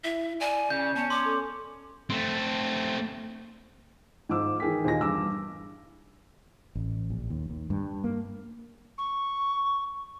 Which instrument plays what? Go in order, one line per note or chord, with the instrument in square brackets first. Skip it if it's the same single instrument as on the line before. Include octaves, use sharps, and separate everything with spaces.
[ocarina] E4 [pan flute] E5
[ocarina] D5 [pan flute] G#5
[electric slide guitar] C#3 [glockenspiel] G6
[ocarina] B3 [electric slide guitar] C#4 [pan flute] A5
[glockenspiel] C6 [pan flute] D6
[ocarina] A4
[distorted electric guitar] A3 C4
[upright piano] G#2 F3 D6 E6
D#3 E3 G#4 A#4 G5 B6
D#2 A#2 D#4 G#5 A#6
E2 G2 D6 E6
[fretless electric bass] A1
A#1
D#2
D#2
G2
A#3
[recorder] C#6